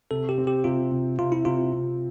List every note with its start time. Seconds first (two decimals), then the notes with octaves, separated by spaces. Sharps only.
0.11 C3 A4
0.29 G4
0.38 C4
0.47 G4
0.64 C3 F4
0.92 C3
1.19 C3 F4
1.32 E4
1.45 C3 F4
1.73 C3